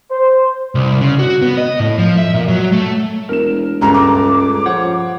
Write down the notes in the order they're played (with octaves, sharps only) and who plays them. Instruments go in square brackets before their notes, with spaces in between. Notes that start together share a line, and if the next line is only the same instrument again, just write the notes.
[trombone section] C5
[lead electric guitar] C2
C#3
F#4
B3
D#5
A2
F3
E5
A#2
F#3
A3
[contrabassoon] E1 [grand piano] A#4 E7
[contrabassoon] C#2 [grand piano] G2 A#2 A3 [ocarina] A#5
[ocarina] D6
[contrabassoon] F3 [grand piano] C5 C#5 F#5